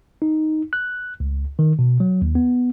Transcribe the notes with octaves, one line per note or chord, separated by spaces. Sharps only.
D#4
F#6
C#2
D#3
B2
F#3
D#2
B3